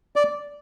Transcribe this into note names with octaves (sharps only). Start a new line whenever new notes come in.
D5